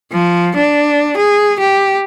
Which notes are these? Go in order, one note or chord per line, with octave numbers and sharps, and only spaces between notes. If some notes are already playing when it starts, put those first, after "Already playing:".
F3
D4
G#4
G4